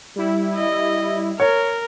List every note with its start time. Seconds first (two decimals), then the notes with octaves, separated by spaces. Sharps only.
0.16 G3 E4
0.56 D#5
1.40 A#4 C#5